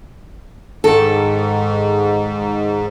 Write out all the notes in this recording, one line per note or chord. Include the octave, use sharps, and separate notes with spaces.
G#2 D#3 A4